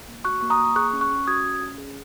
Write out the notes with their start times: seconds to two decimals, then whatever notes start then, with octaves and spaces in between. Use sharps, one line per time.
0.08 A#3
0.25 F#4 C#6 F#6
0.41 A#3 C#6
0.50 A#5 D#6
0.58 A#3
0.76 G#4 C#6 F#6
0.93 C#4
1.01 C#6 F#6
1.10 C#4
1.27 F#4 D#6 G#6
1.44 C#4
1.61 C#4
1.78 G#4